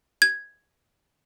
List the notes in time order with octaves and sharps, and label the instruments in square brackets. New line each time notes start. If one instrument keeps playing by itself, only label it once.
[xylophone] G#6